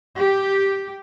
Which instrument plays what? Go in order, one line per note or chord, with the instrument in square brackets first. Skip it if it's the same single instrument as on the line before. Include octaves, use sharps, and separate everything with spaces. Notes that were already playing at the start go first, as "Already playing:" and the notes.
[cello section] G4